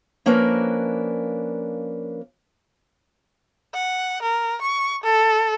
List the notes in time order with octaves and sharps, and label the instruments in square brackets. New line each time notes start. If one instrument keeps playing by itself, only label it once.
[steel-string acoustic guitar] F3 A#3 C#4 D4 A#4 B4
[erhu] F#5
A#4
C#6
A4